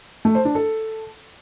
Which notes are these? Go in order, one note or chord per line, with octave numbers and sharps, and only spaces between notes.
A3
C5
D4
A4